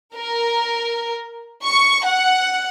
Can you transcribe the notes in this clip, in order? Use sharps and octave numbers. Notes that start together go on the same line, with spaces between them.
A#4
C#6
F#5